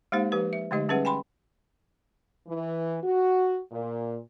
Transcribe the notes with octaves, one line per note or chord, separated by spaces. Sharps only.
G#3 A#3 D#4 G4 C5 F5
F3 G4 B4
E5
D3 G#3 A3 D#4 G4 D#5
G3 C#4 G#4 B4 E5 F#5
G5 G#5 B5 C6
E3
F#4
A#2